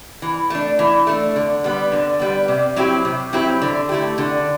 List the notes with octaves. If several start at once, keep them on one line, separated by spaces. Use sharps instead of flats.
E3
A3 D4
E3
A3 D4
D3
G3 B3
D3
G3 B3
C3
F#3 C4 E4 G4
C3
F#3 C4 E4 G4
D3
A3 E4 G4
D3